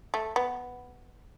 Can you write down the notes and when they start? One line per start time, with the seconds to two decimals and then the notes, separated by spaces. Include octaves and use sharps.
0.14 A3
0.36 B3